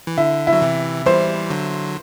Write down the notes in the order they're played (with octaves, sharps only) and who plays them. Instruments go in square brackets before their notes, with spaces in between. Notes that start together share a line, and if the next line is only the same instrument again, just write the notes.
[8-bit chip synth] E3
[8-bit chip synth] D3 [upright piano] E4
[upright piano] E4
[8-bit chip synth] F#3
C3 E3
[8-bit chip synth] E3 G3 [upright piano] C5
[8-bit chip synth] D3 F#3